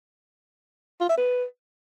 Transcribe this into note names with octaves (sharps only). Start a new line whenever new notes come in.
F4
E5
B4